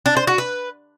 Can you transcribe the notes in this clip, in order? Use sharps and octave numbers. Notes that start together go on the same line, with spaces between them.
D4
C5
F#4
B4